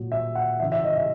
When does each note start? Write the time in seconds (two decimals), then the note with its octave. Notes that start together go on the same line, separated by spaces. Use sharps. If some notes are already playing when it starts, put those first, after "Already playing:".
Already playing: A#2 F#3
0.12 E5
0.35 F#5
0.59 E3 E5
0.63 C#3
0.72 E5
0.84 D#5
0.96 E5